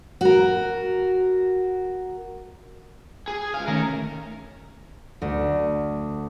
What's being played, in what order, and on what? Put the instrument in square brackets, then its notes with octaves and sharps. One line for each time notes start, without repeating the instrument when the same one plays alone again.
[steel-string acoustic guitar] F#4 A#4
[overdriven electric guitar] G#4
C#2 F5
[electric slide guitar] D#3 A3 C#4 [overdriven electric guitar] A#4
[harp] D2